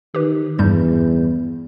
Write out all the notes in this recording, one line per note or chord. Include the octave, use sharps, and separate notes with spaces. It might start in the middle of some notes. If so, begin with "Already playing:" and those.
D#3 G4 B4
E2 G2 G3 G6